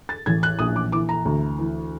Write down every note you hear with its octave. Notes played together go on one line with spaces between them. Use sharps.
A6
A1 G#6
F#6
A#1 D#6
D6
E3 D6
A#5
D2
E3